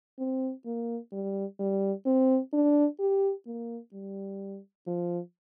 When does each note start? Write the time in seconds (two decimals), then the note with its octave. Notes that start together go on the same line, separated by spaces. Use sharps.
0.19 C4
0.66 A#3
1.12 G3
1.60 G3
2.06 C4
2.53 D4
3.00 G4
3.46 A#3
3.93 G3
4.87 F3